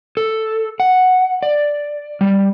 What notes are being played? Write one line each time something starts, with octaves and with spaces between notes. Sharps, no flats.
A4
F#5
D5
G3